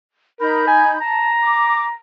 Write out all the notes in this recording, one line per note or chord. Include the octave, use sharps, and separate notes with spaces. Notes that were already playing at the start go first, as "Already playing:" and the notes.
D#4 A#4 B5 G6
G#5
A5 A#5
D6